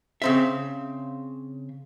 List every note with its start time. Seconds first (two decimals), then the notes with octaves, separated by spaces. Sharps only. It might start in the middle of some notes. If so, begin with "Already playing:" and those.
0.22 C#3 C4 E5